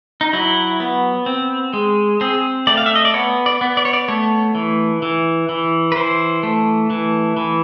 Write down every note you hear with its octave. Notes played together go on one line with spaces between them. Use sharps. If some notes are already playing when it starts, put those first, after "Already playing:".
D#4
F#3 E4
B3
C4
G#3
C4 G#4
A3 D5
F5
E5
D#5
D5
B3 C#5
D5
B3
D5
C#5
D5
A3 C#5
E3
E3
E3
B4
E3 C5
A3
E3
E3